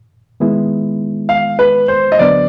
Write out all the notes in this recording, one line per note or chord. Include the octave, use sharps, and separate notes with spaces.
D#3 G#3 B3 E4
F5
B4
C5
D#5
D2 D3 F#3 B3 D4 D5